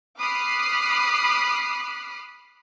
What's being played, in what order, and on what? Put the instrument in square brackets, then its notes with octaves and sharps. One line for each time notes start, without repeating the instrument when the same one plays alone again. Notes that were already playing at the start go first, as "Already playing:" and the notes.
[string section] B5 D6 D#6 F6 F#6 C7